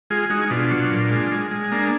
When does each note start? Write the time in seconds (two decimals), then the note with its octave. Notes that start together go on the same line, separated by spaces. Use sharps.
0.10 G#3 F4 G#4
0.30 G#3 D#4 F#4
0.50 B2 D4 F4
0.71 F#3
0.91 A#2
1.11 G#3
1.31 G#3
1.51 G#3
1.71 A#3 D4